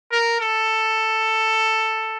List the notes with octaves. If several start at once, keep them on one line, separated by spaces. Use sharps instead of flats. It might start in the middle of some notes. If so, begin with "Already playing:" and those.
A#4
A4